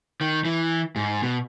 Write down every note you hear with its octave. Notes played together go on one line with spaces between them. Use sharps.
D#3
E3
G#2
B2